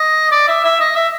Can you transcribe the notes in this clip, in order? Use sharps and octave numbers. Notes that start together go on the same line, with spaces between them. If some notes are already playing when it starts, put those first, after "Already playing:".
Already playing: D#5
D5
E5
E5
D#5
E5